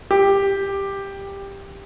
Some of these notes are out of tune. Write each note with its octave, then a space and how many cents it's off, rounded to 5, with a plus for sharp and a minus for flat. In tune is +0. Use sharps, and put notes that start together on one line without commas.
G4 +10